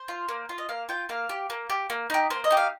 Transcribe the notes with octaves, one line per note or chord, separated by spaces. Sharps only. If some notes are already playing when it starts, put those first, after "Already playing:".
Already playing: C5
F4
A#3
F4
D#5
A#3 F5
F4 G5
A#3 F5
G4
A#3
G4
A#3
D#4 G4
A#3 C5
D#5
D#4 G4
F5